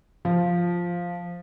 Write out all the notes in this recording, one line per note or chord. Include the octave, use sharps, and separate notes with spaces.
F3